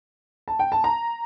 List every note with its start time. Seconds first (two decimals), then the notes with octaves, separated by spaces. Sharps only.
0.48 A5
0.59 G5
0.72 A5
0.84 A#5